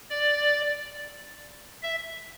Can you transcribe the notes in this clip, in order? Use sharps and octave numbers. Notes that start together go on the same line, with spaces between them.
D5
E5